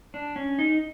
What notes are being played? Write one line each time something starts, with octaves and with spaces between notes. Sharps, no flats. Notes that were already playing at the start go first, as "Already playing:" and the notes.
D4
C#4
D#4